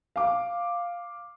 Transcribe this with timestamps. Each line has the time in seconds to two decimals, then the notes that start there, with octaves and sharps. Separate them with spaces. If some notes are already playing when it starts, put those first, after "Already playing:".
0.16 F5 D6